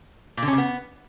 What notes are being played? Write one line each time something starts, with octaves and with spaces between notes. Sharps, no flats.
A#2
D3
C#4
C#3
B3